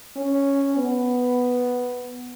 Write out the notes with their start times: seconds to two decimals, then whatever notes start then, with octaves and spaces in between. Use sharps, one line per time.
0.16 C#4
0.77 B3